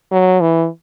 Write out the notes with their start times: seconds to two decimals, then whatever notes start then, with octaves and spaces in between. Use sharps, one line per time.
0.11 F#3
0.41 E3